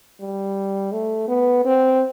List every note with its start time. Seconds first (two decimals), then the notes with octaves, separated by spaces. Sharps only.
0.21 G3
0.92 A3
1.28 B3
1.65 C4